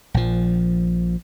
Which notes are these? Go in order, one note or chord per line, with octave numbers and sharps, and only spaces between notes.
A#1 F3